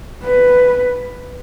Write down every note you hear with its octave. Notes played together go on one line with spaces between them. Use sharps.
B4